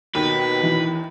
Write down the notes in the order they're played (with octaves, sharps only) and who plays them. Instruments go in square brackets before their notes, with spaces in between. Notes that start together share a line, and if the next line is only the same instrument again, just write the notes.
[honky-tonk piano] D#2 D#3 [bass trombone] B2 [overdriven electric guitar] B4
[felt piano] E3